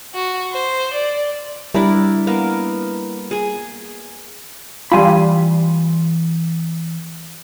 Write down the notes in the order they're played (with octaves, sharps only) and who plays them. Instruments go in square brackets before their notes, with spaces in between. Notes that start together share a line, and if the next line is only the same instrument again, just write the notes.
[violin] F#4
C5
D5
[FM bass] G3 [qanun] D4 E4 A#4
[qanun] A#3 B3 A#4
G#4 G#5
[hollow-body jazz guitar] E3 G#5 B5 [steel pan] G3 F4